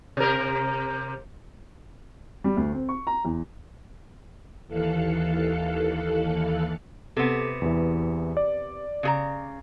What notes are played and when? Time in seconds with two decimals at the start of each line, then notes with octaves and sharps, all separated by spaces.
0.17 C3 A#4
2.44 G3
2.56 D2
2.72 C4
2.89 C#6
3.07 A#5
3.25 E2
4.67 D#2 E3 A4 F5 F#6 C#7
7.17 C3 B3 A4
7.62 E2 E3
8.37 D5
9.03 C#3 G#4 A#5